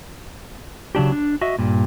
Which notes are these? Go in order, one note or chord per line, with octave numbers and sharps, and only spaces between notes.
C#3 F#3 D4 G4
D4
F#4 D#5 E5
G2 A#2